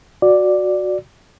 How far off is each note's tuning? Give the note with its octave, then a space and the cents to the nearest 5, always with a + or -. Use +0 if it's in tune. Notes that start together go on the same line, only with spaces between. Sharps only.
F#4 -10 D5 +5